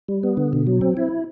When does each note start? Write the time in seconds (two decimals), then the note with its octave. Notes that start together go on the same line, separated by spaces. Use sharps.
0.08 G3
0.23 B3
0.37 D3
0.53 B2
0.67 F#3
0.81 C4
0.97 E4